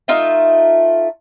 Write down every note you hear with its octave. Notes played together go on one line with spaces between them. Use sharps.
A3 D#4 F4 E5